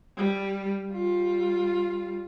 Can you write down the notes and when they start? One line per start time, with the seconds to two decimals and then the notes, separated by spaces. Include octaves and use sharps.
0.17 G3
0.93 G3 F4